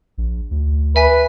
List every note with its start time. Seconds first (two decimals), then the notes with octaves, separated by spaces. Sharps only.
0.18 A#1
0.51 D2
0.96 B4 E5 G#5 B6